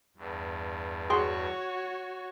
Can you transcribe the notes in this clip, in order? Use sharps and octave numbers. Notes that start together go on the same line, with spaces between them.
E2 G2
F#4 G#4 C#5 G5 C6